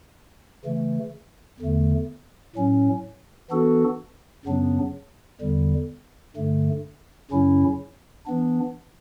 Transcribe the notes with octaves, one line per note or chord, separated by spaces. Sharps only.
C#3 E3 A3
E2 D3 A3
A2 F#3 C#4
E3 B3 D4 F#4 A4
F#2 C#3 F#3 B3 D4
E2 D3 G3
G2 D3 A3
F#2 C#3 F#3 C#4 E4
E3 B3 D4